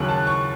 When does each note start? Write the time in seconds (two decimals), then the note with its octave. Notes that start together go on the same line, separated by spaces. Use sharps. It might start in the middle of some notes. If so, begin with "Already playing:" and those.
Already playing: D#2 C#3 F#3 F#6
0.08 A5
0.27 C#6